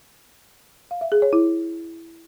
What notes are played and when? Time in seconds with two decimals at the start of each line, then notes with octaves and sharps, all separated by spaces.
0.91 F5
1.01 E5
1.12 G#4
1.22 C#5
1.33 E4